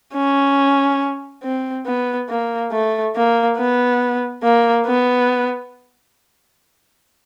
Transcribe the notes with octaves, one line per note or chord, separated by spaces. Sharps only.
C#4
C4
B3
A#3
A3
A#3
B3
A#3
B3